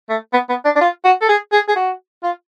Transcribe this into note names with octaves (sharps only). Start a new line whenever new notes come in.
A3
B3
B3
D4
D4
F4
F#4
A4
G#4
G#4
G#4
F#4
F4